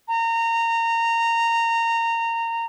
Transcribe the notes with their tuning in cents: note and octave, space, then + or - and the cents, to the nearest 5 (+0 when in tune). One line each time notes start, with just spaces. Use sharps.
A#5 -20